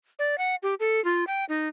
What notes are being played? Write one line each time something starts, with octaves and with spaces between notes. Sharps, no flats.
D5
F#5
G4
A4
F4
G5
D#4